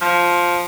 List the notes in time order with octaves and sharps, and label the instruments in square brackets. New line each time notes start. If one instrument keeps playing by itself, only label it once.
[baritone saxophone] F3